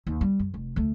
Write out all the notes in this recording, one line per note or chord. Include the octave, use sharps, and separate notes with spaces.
D#2
G3
F#2
F1
D2 A3